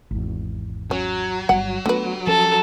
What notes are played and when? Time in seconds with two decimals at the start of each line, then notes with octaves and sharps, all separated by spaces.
0.11 G#1 E2
0.91 F#3 C#4
1.49 G1 G3 F#5
1.86 D3 A3 B3 B4
2.27 F3 C#4 A4